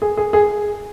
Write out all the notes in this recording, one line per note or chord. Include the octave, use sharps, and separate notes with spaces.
G#4
G#4
G#4